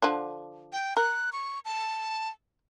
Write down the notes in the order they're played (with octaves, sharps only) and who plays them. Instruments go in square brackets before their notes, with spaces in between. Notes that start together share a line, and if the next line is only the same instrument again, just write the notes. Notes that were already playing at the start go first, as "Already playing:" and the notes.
[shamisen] D3 F3 D4
[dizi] G5
[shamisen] A#4 [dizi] F#6
[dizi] C#6
A5